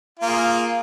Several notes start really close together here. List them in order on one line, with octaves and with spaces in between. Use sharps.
F4 A#3 G#4